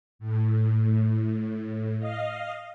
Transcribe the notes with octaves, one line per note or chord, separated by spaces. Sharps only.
A2
D#5 F5